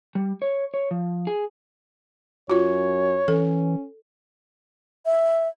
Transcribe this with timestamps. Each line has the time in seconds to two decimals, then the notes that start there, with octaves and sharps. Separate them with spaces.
0.15 G3
0.42 C#5
0.74 C#5
0.91 F3
1.27 G#4
2.50 F#2 F4 F#4 C#5
3.28 E3 C#4 A4
5.06 E5